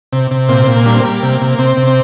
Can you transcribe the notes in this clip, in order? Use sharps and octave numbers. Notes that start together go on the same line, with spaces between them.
C3
C3
A#2 C4
A#2
A#3
G3 D4
C4
G3 A#3
C3
C3
C3 C4
C3
C4